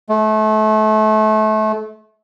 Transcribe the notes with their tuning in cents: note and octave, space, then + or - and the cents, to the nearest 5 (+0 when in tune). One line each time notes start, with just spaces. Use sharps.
A3 -30